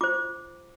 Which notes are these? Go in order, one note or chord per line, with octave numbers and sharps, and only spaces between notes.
F4 C5 D6